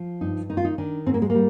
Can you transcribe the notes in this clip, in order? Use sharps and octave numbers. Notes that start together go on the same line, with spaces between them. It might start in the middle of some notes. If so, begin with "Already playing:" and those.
Already playing: F3
G2 D#4
D#3 D#4
F4
D#4
D#3 D4
G#2 C4
A#3
G#3
G3 A#3